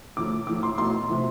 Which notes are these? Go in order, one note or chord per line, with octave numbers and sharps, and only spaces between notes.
D3 F3 A3 D6
A2 F3 A3 D6
C6
B2 A3 C6
C3 F3 A3